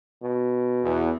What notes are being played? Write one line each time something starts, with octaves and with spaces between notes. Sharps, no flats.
B2
E2